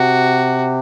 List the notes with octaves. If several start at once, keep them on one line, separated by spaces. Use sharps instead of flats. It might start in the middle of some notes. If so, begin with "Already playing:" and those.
Already playing: C3 F#4